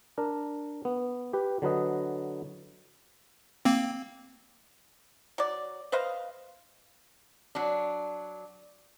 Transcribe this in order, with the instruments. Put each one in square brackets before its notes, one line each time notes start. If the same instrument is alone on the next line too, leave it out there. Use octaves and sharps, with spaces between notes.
[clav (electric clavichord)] D4 A#4
B3
G4 B4
D3 F#3 B4 D#5
[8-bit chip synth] A#3 C4
[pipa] F#3 D5
B4 C5 D#5 F5
[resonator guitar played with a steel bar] F#3 D4